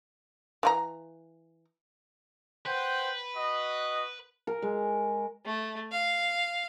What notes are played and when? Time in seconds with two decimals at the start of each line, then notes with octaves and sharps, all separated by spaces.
0.63 E3 F4 A#5
2.66 B4 C5 F#5 G5
3.35 F#4 D#5
4.47 A#4
4.62 G#3
5.45 A3
5.91 F5